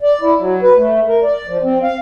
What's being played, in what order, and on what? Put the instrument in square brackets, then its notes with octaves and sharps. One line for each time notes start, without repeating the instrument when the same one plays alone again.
[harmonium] D5
E4
F#3
B4
A3
A#4
D5
F3
C4
F5